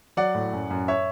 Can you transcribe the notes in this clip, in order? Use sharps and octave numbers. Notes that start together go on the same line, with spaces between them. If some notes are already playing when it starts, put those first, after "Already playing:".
F#3 D5 F#5
A2
F#2
F#2
C#5 E5